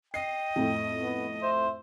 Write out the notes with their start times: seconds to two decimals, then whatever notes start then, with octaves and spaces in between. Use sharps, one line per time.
0.14 D#5 G5 C7
0.56 F2 A2
1.02 B3
1.43 C5 E5